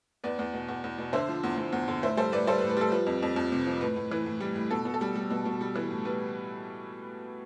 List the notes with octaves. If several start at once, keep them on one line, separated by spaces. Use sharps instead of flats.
E2 B4 D5
E2
B2
E2
E2
B2
D3 C5 E5
F3
E2
E2
E2
D3
A2 C5 E5
G3 A4 C5
A2 B4 D5
G3 A4 C5
B4
A2
B4
G3 A4
F3 B4
F2
F2
F2
C3
F3
A2 B4
A2
E3
A2
G3
A2
B2 A4
B2
A4
G3
G3
B2
B2
G3
E3
A2
G3 B4